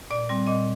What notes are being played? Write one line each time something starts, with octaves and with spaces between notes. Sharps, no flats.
A#2 D5
G3 C4
A#2 D#5